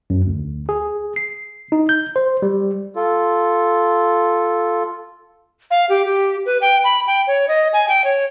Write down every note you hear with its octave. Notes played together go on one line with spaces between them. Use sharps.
F#2
D2
G#4
C7
D#4
G6
C5
G3
F4 A4
F5
G4
G4
B4
G5
B5
G5
C#5
D#5
G#5
G5
C#5